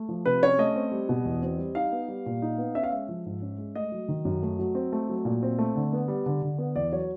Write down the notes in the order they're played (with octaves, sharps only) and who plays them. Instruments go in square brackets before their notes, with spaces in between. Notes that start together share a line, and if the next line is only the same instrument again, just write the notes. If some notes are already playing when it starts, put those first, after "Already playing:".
Already playing: [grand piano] A3
F3
C3 B4
C#4 C#5
A3 D#5
C4
G3
B2
E2
C4
G3
D#4 F5
B3
G3
A#2
D#4
B3
C#4 E5
F5
G#3 E5
F3
G#2
C#4
G#3
A3 D#5
F#3
D#3
F#2
A3
F#3
C4
A3
F#3
A#2
C4
A3
D3
B3
G3
D3
D3
B3
E2 D5
F#3 C#5